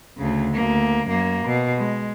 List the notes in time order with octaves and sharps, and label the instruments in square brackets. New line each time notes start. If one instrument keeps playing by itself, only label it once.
[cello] D2 C#3
D2 A#3
F#2 A#3
B2
G#3